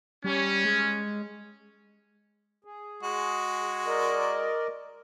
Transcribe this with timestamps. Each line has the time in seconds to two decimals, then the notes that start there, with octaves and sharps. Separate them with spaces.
0.24 G3 C#4
0.65 G#3
2.64 G#4
3.03 G#3 F#4
3.86 A#4 D5 D#5